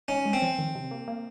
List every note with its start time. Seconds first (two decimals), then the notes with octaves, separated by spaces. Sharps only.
0.08 C#4 D#4
0.25 G#3
0.33 C4
0.42 F3
0.59 D#3
0.75 C3
0.91 A#3
1.08 A#3